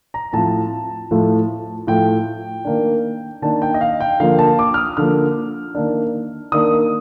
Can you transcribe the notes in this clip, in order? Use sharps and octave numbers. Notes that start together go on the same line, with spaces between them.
A#5
A2 F3 C4 A5
A2 F3 A3
A2 F3 A3 G5
D#3 A#3 D4
D#3 A#3 D4 A5
G5
D#5
F5
G5
D3 F3 A#3 F5
A5
D6
F6
D#6
D3 F3 A#3 F6
D#3 A#3 D4
D#3 A#3 D4 D#6